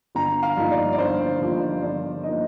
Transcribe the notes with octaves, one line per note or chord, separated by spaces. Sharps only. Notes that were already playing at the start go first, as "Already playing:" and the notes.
G1 A#5
F5
G2 F3 A#3 D#4
D5
D5
G1 C5
G2 F3 A#3 D#4
G1 D5
F3 A#3 D#4 D#5